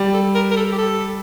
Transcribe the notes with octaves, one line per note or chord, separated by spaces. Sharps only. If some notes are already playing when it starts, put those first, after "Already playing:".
Already playing: G3
A4
A#4
A#4
A4
G4
A4